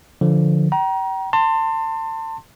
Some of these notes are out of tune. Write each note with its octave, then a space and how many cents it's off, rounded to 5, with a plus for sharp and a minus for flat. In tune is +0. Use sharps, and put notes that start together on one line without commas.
D3 +0 F3 +0
G5 -35 A#5 +30
A5 +30 C6 +0